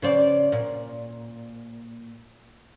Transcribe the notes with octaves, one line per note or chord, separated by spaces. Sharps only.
C#3 C5 D5
A#2